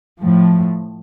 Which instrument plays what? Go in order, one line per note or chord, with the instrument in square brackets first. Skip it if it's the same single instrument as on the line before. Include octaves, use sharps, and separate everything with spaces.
[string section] A2 F3